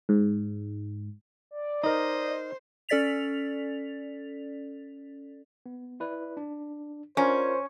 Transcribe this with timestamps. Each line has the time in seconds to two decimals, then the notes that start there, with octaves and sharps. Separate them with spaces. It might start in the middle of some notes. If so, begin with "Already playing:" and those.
0.09 G#2
1.51 D5
1.83 D#4 A#4 C5 D#5
2.89 C#4 A4 D5 A6 B6 F7
5.66 B3
6.00 E4 B4 D5
6.37 D4
7.17 C#4 F4 A#4 C5 D5